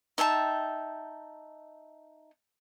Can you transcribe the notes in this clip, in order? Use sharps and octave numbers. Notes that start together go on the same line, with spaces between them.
D#4 E5 G5 A5